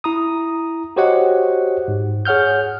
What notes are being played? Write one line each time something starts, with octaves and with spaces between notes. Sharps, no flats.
E4 A#5 D#6
F#4 G4 C5 C#5 D#5 F#5
G#2
G#4 C#5 F#5 F6 G6